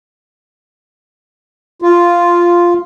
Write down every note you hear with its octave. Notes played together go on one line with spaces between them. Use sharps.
F4